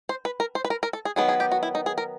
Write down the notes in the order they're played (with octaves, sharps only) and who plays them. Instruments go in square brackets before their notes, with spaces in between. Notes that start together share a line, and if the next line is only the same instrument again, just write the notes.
[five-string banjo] C5
B4
A#4
C5
B4
A#4
A#4
A4
G#4
D#3 F#3 B3 G#4
G#4
G4
F#4
E4
D#4
G#4
A#4